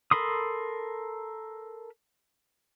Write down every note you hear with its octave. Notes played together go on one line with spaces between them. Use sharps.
A4 A#4 B5 C6 D#6